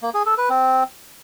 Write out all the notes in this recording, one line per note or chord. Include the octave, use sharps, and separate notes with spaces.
A#3
G#4
A4
B4
C4